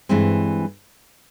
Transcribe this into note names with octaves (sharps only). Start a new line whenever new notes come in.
G2 E3 G#3 C4